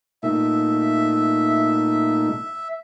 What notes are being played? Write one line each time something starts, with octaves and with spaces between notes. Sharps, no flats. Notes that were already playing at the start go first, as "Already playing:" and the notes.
A#2 A3 D#4 E5